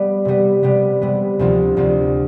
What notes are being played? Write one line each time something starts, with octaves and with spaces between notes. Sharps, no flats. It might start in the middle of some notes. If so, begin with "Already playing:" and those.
Already playing: G3 B3
C3 G3 B3
C3 G3 B3
C3 G3 B3
D2 C3 F3 C4 F4
D2 C3 F3 C4 F4